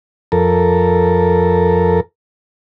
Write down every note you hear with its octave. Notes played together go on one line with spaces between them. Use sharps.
F2 A4 A#4